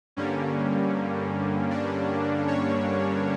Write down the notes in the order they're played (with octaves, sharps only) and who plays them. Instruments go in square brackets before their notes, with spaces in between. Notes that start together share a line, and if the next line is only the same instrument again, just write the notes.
[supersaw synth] G2 D3 G3 A#3 C#4
D4
C#5